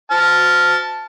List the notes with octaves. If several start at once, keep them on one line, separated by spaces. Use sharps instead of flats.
A5 F6